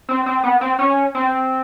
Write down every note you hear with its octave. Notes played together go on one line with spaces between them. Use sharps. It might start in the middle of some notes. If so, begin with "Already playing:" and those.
C4
C4
B3
C4
C#4
C4